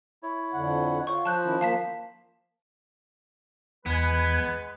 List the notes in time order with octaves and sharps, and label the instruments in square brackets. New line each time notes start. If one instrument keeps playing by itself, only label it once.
[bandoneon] E4 C#5
[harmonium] F2 D3 F#5
[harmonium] F4 [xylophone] C#5 C#6
[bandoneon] F3 [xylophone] A5 F#6 G6
[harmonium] D#3 C#4 E4
[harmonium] A#3 [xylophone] F5 A5 B6
[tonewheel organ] E2 G#5 [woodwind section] G#3 B4 [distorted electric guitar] B3